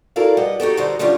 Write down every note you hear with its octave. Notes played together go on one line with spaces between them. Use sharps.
E4 F#4 A4 A#4 D5 F5
G3 B4 D#5 F#5
D#4 F#4 G4 A4
D3 G3 D#4 F#4 C5 A#5
D3 G3 C#4 D4 F4 D5